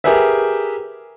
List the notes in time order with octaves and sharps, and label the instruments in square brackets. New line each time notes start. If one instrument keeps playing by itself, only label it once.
[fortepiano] G4 G#4 A#4 B4 E5